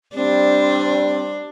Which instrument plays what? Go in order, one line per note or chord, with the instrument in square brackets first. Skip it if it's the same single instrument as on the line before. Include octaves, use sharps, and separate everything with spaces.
[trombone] G3 [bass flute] C4 [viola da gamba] D4